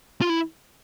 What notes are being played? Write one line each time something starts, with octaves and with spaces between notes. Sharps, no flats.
F4
E4